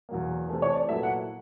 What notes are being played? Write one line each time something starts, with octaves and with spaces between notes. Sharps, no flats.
E2 B2 F#3 A#3
C3 E3 A3
C#5
D5
A#2 F#3 B3 E4 A4 E5
F#5